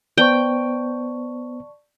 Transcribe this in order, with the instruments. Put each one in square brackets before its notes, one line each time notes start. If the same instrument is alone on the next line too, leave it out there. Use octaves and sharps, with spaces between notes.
[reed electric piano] B3 C5 [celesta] D5 A5 C#6 [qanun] G5